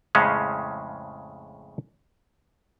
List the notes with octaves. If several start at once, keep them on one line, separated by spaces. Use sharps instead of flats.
F2 A2 C#3 G#3 C#4